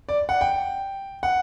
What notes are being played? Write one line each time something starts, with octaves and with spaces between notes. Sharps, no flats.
D5
F#5
G5
F#5